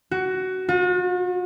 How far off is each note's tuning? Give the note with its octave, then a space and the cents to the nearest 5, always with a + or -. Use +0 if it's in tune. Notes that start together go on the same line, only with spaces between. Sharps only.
F#4 +15
F#4 -45